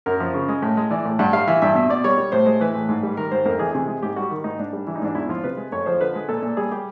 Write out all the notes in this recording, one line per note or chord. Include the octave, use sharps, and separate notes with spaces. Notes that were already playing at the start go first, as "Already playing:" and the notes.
F#2 A#4
F3
C#3
G#3
A2
G#3
E3 D5
A2
G2 F#5
G3 F5
E3 E5
G2 E5
B2 E5
B2 D5
G3 C#5
G3
A2 C5
G#3
E3 B4
A2
G#2
G3
D#3 A#4
G#2 C5
F2 A#4
E3 G#4
C3 G#4
G#3
G#2 G4
G3 F#4
D#3
G#2 D#4
G#2 D4
G3
E3 D4
D#4
G#2 D4
E2 E4
F3 F4
C3 B4
G#3
F2 C#5
F3 C5
D3 B4
G#3
A#2 A4
A#2
G3 G#4
G3 G4